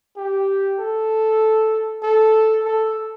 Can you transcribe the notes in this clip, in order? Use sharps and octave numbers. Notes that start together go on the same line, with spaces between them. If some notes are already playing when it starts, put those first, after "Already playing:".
G4
A4
A4
A4